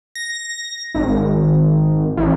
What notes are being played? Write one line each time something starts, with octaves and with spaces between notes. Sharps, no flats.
A#6
G#1
A1